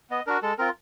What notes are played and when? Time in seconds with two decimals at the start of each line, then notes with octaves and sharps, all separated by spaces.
0.10 B3 D#5
0.27 D4 F#4 A#4
0.43 G#3 A4
0.58 C4 F4 A#4